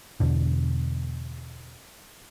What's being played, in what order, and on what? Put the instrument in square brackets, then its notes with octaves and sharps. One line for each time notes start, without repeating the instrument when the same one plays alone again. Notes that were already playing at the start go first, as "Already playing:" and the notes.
[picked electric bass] E2 B2 D3